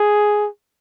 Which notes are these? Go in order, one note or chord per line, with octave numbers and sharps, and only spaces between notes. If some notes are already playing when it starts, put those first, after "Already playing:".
Already playing: G#4